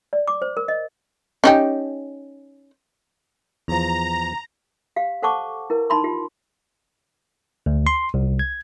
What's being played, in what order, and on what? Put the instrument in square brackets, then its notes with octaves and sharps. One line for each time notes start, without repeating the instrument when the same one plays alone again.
[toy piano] D5
D6
C5
A#4
D#5
[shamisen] C#4 D#4 G4
[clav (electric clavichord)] E2 F3 [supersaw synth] A#5
[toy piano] G4 F5
A4 C5 F#5 A5 C#6 D6
E4 A#4 B4
D#4 A5 B5 C6
F4 G4
[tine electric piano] D2
C6
C2
G#6